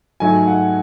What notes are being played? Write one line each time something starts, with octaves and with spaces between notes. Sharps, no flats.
G#2 F#3 A3 G#5
F#5